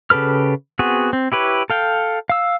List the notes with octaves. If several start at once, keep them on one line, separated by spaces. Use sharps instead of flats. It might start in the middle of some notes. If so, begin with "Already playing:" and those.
C#3 G4 A4 B4 F6
B3 C4 F#4 G#4
C4
E4 G4 B4 C#5
A4 F5 G5
F5 E6